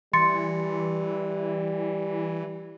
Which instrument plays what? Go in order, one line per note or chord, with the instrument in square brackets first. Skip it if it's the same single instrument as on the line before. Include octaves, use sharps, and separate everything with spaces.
[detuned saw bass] E3 [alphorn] G3 [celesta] C6 A6 C#7